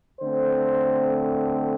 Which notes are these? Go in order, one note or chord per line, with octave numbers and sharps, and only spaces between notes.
D3 A3 C4 C5